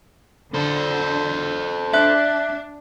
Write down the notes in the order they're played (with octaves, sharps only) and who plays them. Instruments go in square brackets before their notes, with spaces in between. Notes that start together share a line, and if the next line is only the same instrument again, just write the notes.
[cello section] D3 [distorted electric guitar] A4 C5
[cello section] D4 [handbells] E5 F#6